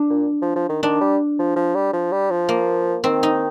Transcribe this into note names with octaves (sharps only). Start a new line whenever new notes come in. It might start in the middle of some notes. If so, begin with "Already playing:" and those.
Already playing: D4
A#2
F3
F3
D#3
D#3 D4
G3
F3
F3
G3
F3
G3
F3
A#3
D#3 C4
D#4